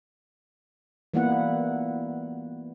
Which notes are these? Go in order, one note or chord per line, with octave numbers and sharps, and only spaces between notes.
E3 G3 A#3 B3 E4 F#5